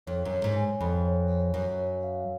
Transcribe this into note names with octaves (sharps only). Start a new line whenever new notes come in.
F2 C#5
F#2
C#5
G#2
G#5
F2 B5
C#5
C#5
F#2 C#5
C#5
F5